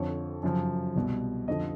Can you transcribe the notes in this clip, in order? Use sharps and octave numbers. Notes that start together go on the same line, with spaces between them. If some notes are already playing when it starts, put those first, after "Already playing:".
Already playing: F2 D3 F3 C#5
F#2 C#3 F3
C2 B2
F2 D3 F3 D#5